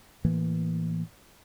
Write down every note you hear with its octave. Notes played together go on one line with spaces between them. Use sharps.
A2 E3 A#3